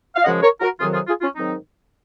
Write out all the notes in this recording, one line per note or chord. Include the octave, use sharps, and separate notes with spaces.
F5
F#2 C#3 F3 G#3 D#5 F#5
A#4 C#5
F#4 A#4
F2 C3 D#3 F#3 F4 G#4
F4 G#4
F4 G#4
C#4 F4
G#2 D#3 F#3 C4 D#4